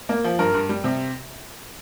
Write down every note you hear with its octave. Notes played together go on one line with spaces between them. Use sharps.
A#3
F3
G2 A#4
G2
G3
C3